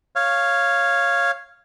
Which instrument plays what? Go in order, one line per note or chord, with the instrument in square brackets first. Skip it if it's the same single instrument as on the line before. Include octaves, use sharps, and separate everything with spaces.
[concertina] C#5 F5